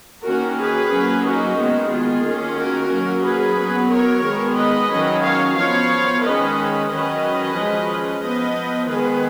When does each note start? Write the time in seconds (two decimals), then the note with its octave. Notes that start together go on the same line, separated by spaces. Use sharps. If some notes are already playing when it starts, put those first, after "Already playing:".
0.25 D#3 A#3 C#4 F#4 A#4
0.58 G#4 B4
0.91 F#3 A#3 C#4
1.25 D#4 F#4
1.58 D#3 G#3 B3
1.91 F4 G#4
2.24 D#3 A#3 C#4
2.57 F#4 A#4
2.91 F#3 A#3 C#4
3.24 G#4 B4
3.57 F#3 B3
3.91 A#4 C#5
4.24 D#3 G#3 B3
4.57 B4 D#5
4.90 D#3 F#3 C#4
5.23 C#5 F5
5.57 F3 B3 C#5 F5
6.23 D#3 G#3 C#4 B4 D#5
6.90 D#3 F#3 C#4 B4 D#5
7.56 F3 G#3 C#4
8.22 F3 B3 B4 D#5
8.89 D#3 G#3 B3 G#4 B4